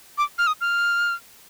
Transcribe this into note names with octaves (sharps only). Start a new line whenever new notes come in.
D6
F6
D#6
F6